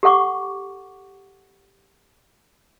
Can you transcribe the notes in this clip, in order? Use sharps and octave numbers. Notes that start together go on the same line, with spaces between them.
G4 A4 F#5 C#6 D6